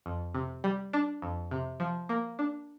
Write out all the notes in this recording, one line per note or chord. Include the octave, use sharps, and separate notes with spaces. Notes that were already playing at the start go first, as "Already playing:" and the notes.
F2
C3
G3
D4
F2
C3
F3
A#3
D4